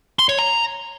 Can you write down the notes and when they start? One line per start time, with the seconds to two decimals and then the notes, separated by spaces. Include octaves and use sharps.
0.19 C6
0.29 C#5
0.39 A#5